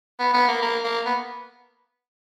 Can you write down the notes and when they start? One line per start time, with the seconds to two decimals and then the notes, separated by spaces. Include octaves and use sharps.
0.19 B3
0.34 B3
0.48 A#3
0.62 A#3
0.84 A#3
1.06 B3